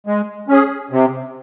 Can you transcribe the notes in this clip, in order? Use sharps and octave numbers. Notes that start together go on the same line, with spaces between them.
G#3
C#4
G#4
C3